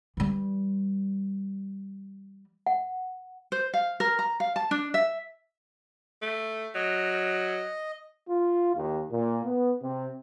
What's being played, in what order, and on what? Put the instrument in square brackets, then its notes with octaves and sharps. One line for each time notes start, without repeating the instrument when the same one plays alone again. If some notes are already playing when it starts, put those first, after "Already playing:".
[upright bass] E3 G3
[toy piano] F#5
[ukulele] C5
F5
A#4
A#5
F5
A5
D4
E5
[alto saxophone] A3
[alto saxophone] F#3 [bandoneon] D#5
[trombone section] F4
D#2
A#2
B3
C3